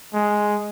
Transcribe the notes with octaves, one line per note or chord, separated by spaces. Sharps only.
G#3